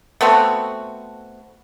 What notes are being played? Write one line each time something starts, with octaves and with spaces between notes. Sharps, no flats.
A3 B3 C4 F#4